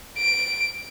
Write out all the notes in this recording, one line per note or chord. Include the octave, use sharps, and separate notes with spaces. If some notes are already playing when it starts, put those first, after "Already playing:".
D7